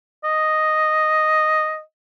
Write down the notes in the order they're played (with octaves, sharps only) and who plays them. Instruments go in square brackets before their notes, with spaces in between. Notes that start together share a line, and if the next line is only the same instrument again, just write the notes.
[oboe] D#5